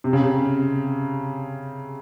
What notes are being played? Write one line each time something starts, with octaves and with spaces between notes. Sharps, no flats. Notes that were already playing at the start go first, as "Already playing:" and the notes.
C3
C#3
C3